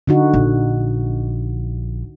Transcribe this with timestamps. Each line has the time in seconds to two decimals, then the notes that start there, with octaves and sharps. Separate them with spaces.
0.07 D3 D#4 F#4
0.33 A#1